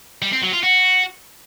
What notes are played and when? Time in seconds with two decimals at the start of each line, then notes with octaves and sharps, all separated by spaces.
0.22 G3
0.33 C4
0.43 F#3
0.53 F4
0.63 F#4